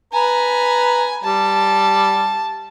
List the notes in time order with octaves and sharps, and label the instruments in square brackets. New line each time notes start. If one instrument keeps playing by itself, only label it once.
[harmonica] B4 A#5 [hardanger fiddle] G#5
[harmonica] G3 [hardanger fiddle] A5